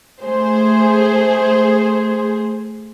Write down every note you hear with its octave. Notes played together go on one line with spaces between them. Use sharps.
A3 G#4 C5